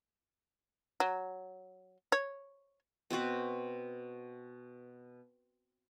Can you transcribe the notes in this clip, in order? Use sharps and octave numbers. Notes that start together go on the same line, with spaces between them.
F#3
C#5
B2 C4 F#4 B4